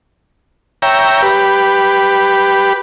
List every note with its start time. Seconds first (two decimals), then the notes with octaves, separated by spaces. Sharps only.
0.82 C#5 E5 G5 A#5
1.22 G4 B4